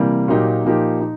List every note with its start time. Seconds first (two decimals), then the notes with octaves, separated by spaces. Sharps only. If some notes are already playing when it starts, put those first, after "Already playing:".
Already playing: C3 E3 G3 A#3
0.28 A#2 F#3 A#3 D#4 G4
0.65 A#2 F3 A#3 D#4 G4
1.01 D#4